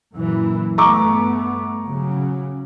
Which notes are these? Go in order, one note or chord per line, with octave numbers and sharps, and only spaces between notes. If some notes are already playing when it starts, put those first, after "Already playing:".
F#2 A#2 E3
G2 A3 B3 A#5 C#6 D6
C#3 F#3